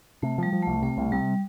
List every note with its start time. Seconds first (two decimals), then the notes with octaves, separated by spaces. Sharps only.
0.22 C3 A3
0.38 F3 G3
0.53 F3
0.62 C2 A3
0.83 C3 A3
0.97 C2
1.12 C3 G3